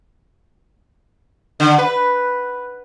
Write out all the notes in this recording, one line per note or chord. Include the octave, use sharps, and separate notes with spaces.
D3
B4